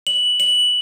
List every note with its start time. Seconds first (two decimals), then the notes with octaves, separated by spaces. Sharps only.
0.07 F#7
0.40 F#7